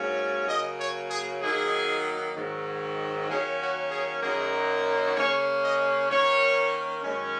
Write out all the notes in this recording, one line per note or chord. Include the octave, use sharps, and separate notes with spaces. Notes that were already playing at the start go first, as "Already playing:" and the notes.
Already playing: G#2 F#3 A#3 C#4
C#3 F#3 A#3 D#5
C#5
G#4
D#3 F#3 A#3 D#4 G#4
G#2 D#3 F#3
D#3 F#3 A#3 C#4 G#4
F#4
G#4
F#2 D#3 F#3 A#3 D#4 G#4
C#3 A#3 C#4 C#5
D#5
D#3 A#3 C#4 C#5
F#2 D#3 G#3 C#4